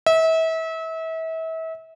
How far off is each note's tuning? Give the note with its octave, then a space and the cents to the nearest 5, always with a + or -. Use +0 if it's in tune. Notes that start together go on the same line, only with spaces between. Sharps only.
E5 -35